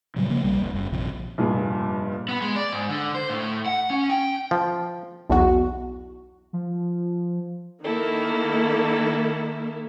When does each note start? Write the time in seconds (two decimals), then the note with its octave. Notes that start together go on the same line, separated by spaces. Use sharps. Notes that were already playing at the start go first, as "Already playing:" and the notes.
0.16 A#2 C#3 F#3 G3
0.29 C#3 F3 A#3
0.44 B1 G3
0.62 F1
0.75 F#1
0.92 A#1 C3 F3
1.38 F1 G2 A#2 G#4
2.29 B3
2.41 G#3
2.56 D5
2.72 G#2
2.89 D3
3.15 C5
3.30 A2
3.66 F#5
3.90 C#4
4.10 G5
4.51 F3
5.30 B1 E2 F#4
6.53 F3
7.84 D#3 A#3 E4 A4